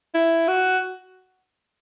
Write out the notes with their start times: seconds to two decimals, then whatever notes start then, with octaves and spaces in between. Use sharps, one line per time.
0.15 E4
0.48 F#4